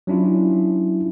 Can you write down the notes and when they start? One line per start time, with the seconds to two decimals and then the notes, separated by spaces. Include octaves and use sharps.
0.07 F#3 C#4 D4 E4 F4